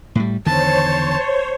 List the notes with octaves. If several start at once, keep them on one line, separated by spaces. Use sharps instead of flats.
A2 G3
E2 D3 D#3 C5 C#5 A5